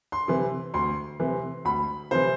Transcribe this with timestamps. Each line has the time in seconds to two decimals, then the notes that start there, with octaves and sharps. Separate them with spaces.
0.12 C6
0.28 C3 E3
0.74 D2 C6
1.20 C3 E3
1.65 D2 B5
2.11 C3 E3 C5